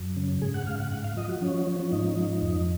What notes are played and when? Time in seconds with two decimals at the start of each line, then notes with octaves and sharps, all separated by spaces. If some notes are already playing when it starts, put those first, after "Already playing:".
Already playing: F#2
0.16 C#3
0.41 G#2 G#4
0.54 F#5
0.67 G#2 F5
0.79 F#5
0.92 G#2 F#5
1.04 F5
1.17 F3 D#5
1.29 F#4
1.42 F3 C#4
1.67 F3
1.80 C#4
1.92 G#2 D#4
2.17 F3
2.42 F2